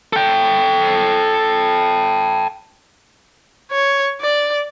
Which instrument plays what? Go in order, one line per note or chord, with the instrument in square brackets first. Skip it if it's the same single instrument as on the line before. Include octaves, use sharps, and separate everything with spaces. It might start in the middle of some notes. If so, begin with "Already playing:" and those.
[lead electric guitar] A4 G5
[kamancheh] C#5
D5